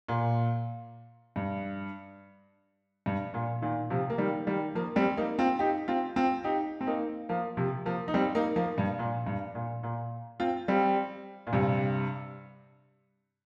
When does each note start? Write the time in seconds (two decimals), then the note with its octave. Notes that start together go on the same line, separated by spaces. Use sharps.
0.08 A#2
1.36 G2
3.06 G2
3.34 A#2
3.62 A#2 D#3
3.90 C3 F3
4.10 A#3
4.18 D#3 G3
4.47 D#3 G3
4.75 F3 A#3
4.96 G3 C4
5.17 A#3 D#4
5.39 C4 F4
5.59 D#4 G4
5.88 C4 F4
6.16 C4 F4
6.44 D#4 G4
6.81 C4
6.87 A#3 D#4
7.29 F3 A#3
7.57 C3 F3
7.86 F3 A#3
8.08 D#4
8.14 G3 C4
8.35 A#3 D#4
8.56 F3 A#3
8.78 G2
8.99 A#2
9.27 G2
9.55 A#2
9.83 A#2
10.40 C4 F4
10.68 G3 C4
11.47 A#2
11.53 G2 C3